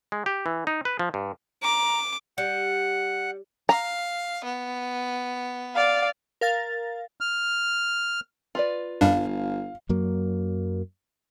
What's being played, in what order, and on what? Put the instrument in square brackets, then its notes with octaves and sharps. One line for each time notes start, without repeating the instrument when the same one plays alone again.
[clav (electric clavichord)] G#3
G4
E3
D#4
B4
F3
G2
[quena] A#5 [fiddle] D6
[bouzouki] G3 [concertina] F#5
[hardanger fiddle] F5 [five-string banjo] A#5
[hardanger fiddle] B3
[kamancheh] D5 F5
[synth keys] A#4 F5 A6
[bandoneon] F6
[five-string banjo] F4 B4 D5
[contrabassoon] G1 [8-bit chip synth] F#2 G3 D4 [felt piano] F5
[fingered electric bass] F#2 F#3 A#3